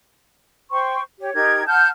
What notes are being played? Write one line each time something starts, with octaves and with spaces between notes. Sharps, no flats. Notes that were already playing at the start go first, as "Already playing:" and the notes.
C5 G5 C6 C#6
G4 C#5
D#4 G4 A#4 G#6
F#5 A5 F6 G6